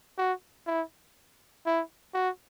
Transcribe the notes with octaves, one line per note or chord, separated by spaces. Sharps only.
F#4
E4
E4
F#4